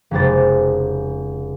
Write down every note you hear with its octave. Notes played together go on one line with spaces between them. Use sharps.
F1 C#3 G#3 G4 C5 A6